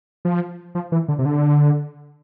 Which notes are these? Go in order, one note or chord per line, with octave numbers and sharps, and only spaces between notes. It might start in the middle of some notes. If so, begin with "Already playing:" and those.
F3
F3
E3
D3
C3
D3